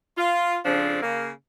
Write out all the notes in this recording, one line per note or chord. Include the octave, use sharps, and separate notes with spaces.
F4
F2 C#3 F3 C4 D4
C#3 A#3